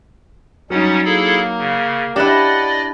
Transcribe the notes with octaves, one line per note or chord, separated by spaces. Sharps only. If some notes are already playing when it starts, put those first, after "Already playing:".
F#3 G3 C#4 D#4 F#5
A#3 E4 G#4 A4
C#3
D4 E4 G4 D5 D#5 F#5 F#6